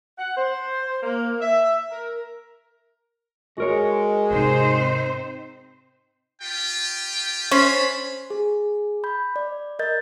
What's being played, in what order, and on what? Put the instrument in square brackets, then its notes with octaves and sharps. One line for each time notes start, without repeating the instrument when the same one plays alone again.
[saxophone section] F#5
C5
A#3
E5
A#4
[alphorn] G#3 [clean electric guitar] F#4 A#4 C#5
[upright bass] G#2 C3 [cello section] C4 D#4 C5
[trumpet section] F4 G4 G5
[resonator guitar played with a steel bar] C#4 C5 [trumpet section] D4 B5
[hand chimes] G#4
B5 G6
D5
A#4 D#5 G6 A6